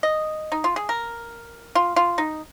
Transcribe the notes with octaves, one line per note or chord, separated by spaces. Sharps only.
D#5
D#4
F4
G#4
A#4
F4
F4
D#4